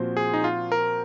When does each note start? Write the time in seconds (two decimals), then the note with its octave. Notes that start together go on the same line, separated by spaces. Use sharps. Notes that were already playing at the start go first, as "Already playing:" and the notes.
Already playing: A#2 F3 C4 F#4 C5
0.17 G#4
0.34 D#4
0.44 F4
0.72 A#4